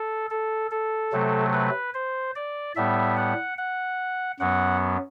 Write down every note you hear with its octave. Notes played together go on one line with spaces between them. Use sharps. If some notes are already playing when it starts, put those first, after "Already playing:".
Already playing: A4
A4
A4
C3 F#3 A3
B4
C5
D5
A2 G3 B3 E5
F#5
F#5
F#2 F#3 B3 F#5